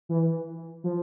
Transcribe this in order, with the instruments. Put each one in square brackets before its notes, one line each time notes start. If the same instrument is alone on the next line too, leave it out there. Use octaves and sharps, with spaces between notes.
[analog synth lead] E3
F3